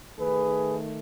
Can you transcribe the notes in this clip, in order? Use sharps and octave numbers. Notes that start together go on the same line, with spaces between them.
D#3 A3 G#4 B4